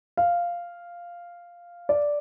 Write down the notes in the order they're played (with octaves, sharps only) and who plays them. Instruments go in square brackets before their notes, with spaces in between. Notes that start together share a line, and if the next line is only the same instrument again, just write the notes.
[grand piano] F5
D5